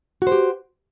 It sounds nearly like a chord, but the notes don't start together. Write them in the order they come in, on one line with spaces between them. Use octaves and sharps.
F#4 C5 G4